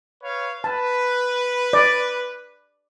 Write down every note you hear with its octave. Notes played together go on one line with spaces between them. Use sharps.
B4 C#5 F5
B4 A5
D5